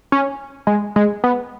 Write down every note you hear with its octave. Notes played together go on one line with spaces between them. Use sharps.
C#4
G#3
G#3
B3